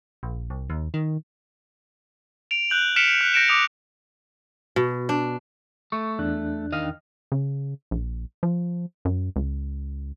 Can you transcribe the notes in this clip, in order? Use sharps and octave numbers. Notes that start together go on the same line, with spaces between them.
A#1
C2
D#2
D#3
D7 F7
F#6 G6 F#7
F6 B6 C#7 D7 E7 F7
F#6
G6 A#6 C#7 D7 E7
D6 D#6 F7
B2
D4
A3 C#6
E2 D4 F#6
D#3 D#5 F5
C#3
A#1
F3
F#2
C#2